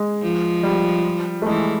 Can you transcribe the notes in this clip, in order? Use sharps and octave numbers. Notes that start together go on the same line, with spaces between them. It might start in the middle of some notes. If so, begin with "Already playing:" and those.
Already playing: G#3
F3
G3
A3
E3 G#3